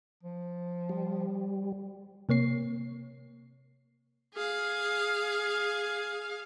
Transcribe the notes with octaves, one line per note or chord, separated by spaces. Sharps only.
F3
G3
C3 A#3 C#5 C7
G#4 F5